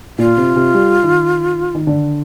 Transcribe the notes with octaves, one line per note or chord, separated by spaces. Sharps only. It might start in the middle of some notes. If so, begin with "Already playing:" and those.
A#2 F4
C3
C3
G3
D#3
D#3
D3